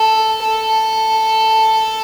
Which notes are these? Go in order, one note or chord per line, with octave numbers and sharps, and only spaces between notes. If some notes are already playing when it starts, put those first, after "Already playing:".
Already playing: A4
A4